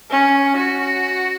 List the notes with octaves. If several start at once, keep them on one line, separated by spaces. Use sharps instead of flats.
C#4
F#4